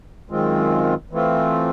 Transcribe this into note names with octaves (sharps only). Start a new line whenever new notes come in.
F#2 D#3 G#3 C4 F4
E3 A3 C4 F4